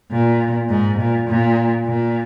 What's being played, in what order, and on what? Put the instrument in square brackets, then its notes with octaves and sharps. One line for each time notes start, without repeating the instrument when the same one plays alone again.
[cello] A#2
G#2
A#2
A#2
A#2